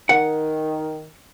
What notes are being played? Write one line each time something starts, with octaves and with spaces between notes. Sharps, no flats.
D#3 F#5